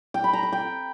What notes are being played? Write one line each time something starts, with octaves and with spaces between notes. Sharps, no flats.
G5
B5
A#5
B5
G5